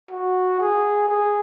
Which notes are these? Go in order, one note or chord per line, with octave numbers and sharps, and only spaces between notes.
F#4
G#4
G#4